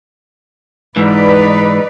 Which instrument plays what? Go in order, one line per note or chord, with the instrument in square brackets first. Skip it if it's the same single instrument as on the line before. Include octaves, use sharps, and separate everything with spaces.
[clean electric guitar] G#2 E3 [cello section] D#4 B4 D5